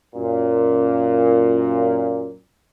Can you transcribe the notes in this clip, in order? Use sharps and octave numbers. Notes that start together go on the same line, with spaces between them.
F#2 A#2